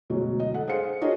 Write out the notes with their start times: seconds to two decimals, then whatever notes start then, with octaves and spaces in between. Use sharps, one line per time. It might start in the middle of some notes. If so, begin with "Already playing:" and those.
0.10 D2 B2 F#3 G#3
0.40 D#5
0.53 A4 F#5
0.68 G#4 C5 F5 C#7
1.01 D4 F#4 G#4 A#4 C#5 D#5